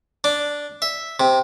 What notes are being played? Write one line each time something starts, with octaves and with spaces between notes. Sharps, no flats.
D4
E5
C3